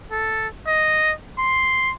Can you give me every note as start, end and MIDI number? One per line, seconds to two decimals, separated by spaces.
0.12 0.48 69
0.67 1.13 75
1.39 1.93 84